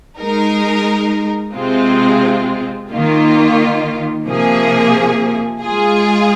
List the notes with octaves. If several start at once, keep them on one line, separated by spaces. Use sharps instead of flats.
G#3 D#4 A#4
C3 G#3 C4 F4
D#3 A#3 F4
C3 F3 A#3 G#4
G#3 F4 G#4